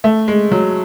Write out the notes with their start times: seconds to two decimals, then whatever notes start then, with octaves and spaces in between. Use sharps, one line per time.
0.04 A3
0.28 G#3
0.52 F#3